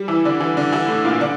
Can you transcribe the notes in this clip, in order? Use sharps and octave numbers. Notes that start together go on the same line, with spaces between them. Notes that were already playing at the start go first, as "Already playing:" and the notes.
Already playing: G3
E3 E4
D3 D4
E3 E4
D3 D4
E3 E4
A2 A3
A#2 A#3
D3 D4